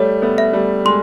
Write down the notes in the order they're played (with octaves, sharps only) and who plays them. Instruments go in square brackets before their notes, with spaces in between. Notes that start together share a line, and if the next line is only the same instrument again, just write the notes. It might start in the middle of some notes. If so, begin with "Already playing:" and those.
Already playing: [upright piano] G3 A3 [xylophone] C#5
[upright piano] A3 B3
[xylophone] E5
[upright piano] G3 A3
[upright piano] G#3 [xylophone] C6